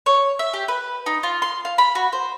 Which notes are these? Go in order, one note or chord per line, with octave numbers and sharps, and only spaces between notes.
C#5
E5
G4
B4
D#4
F4
C6
F5
B5
F#4
C5